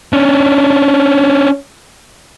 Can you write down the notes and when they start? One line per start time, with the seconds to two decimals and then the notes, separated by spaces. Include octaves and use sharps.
0.13 C#4 D4